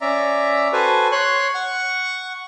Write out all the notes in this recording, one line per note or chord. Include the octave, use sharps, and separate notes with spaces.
C#4 D5 E5 A#5
F#4 A4 B4 C5 G#5
C#5 C6 F#6
F#5 C#6